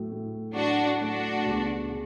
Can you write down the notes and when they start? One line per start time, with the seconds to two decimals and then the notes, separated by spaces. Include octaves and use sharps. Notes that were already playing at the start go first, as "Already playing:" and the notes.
Already playing: A2 F#3 A3
0.11 A2 F#3 A3
0.55 A2 F#3 A3 D4 F#4
1.01 A2 F#3 A3 D4 F#4
1.45 C#2 C#3 G3 B3
1.90 C#3